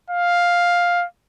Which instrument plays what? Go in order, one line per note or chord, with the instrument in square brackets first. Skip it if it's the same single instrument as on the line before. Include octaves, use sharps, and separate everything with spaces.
[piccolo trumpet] F5